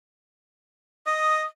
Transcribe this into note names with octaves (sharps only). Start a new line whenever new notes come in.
D#5 D#6